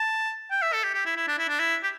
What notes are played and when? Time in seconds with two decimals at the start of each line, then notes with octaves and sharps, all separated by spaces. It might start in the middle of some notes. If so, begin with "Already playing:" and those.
Already playing: A5
0.51 G5
0.62 E5
0.73 A4
0.84 G4
0.94 G4
1.05 E4
1.16 E4
1.28 D4
1.38 E4
1.49 D4
1.59 E4
1.83 G4